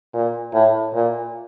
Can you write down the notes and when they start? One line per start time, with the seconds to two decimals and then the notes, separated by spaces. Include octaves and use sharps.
0.14 A#2
0.53 A2
0.93 A#2